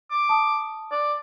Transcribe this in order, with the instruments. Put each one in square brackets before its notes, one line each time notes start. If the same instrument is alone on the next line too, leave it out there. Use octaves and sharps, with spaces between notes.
[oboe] D6
[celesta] A5 D#6
[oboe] D5